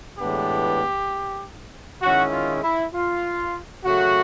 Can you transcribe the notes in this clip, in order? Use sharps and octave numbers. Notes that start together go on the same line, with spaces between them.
A2 E3 G#3 B3 D4 G4
D#3 G#3 C#4 E4 F#4
F4
E4
F4
C#3 F#3 A3 F#4